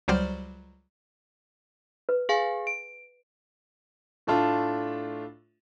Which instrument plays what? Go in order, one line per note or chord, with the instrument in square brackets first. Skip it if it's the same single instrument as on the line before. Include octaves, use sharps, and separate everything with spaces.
[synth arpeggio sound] C#2 F#3 G3 C5 D5 F6
[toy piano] B4
[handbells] G#4 F5 G#5
D7
[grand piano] A2 A3 D4 F4